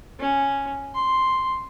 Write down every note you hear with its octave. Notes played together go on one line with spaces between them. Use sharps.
C#4
C6